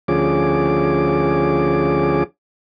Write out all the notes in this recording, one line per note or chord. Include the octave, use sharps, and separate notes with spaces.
D2 F3 C#4 G#4 D6